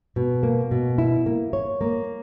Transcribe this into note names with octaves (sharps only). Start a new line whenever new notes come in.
B2
A#3
B2
E4
A#3
C#5
A#3